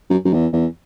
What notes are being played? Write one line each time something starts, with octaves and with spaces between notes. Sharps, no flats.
F#2
F#2
E2
E2